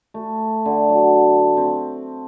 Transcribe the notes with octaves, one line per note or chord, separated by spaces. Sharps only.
A3
D3
F#3
C4